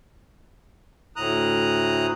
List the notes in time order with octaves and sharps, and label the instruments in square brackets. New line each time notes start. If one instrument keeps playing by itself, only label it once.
[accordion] D2 A2 A#5 D#6 F#6